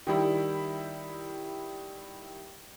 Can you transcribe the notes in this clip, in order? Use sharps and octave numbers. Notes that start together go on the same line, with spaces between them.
D#3 G3 E4